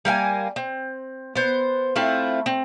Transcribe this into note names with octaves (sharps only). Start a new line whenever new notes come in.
G3 A#3 F5 G#5
C4
B3 C5
A3 C4 E4 F4
C4